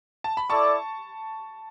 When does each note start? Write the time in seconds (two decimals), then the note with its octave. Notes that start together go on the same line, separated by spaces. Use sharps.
0.24 A5
0.37 B5
0.50 E4 A4 D5 A5 C#6